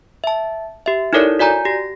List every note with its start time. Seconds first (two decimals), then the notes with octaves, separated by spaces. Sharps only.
0.24 E5 A5
0.86 G4 E5
1.13 D#4 E4 A4 A#4 C#5 D5
1.39 F#4 D5 G#5 A#5 G6
1.65 G4 A#6